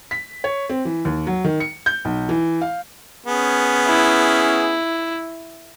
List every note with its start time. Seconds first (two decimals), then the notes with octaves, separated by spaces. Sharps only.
0.11 B6
0.44 C#5
0.69 C4
0.85 E3
1.05 D#2
1.27 F#3
1.44 D#3
1.60 C#7
1.86 G6
2.05 B1
2.29 E3
2.61 F5
3.26 B3 C#4 G#4
3.86 E4